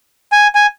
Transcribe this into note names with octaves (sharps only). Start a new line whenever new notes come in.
G#5
G#5